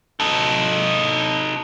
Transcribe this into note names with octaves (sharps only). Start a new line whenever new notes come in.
D#4 A4